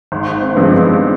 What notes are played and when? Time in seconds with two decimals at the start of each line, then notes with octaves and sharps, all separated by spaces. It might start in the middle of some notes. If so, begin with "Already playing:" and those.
0.12 G#1
0.41 C4
0.51 B3
0.57 G2 F3 G#3 C4
0.71 C4 D#4